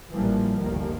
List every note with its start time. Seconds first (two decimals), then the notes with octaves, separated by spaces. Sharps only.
0.12 A1 A#2 E3 F3 G3 A#3
0.60 G1 D2 D#3 A#3